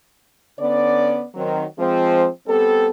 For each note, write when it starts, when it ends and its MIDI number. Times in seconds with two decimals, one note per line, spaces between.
0.59 1.23 50
0.59 1.23 59
0.59 1.23 61
0.59 1.23 74
1.35 1.64 51
1.35 1.64 54
1.35 1.64 60
1.78 2.27 53
1.78 2.27 56
1.78 2.27 60
2.47 2.90 55
2.47 2.90 59
2.47 2.90 60
2.47 2.90 69